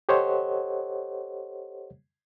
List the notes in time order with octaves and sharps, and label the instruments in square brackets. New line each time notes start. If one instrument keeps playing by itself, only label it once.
[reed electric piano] G4 A4 C5 C#5 D#5 F#5